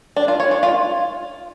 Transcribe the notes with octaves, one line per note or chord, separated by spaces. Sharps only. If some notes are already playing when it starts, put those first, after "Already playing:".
D4
F4
C#5
D4
F4